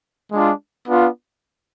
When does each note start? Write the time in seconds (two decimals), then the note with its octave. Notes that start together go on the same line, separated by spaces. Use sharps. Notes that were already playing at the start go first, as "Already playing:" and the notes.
0.32 G#3 D4 F4
0.88 B3 D4 F4